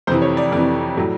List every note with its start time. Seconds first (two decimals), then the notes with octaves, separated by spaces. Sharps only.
0.07 F2 C3 E3 C5
0.22 C#5
0.37 D5
0.52 F2 C3 E3 D5
0.97 A2 F#3